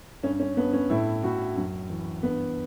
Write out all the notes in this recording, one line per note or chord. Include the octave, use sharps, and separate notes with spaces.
G2 C#4
C#4
G2 B3
C#4
A2 E4
A2 F#4
F#2
E3
G2 B3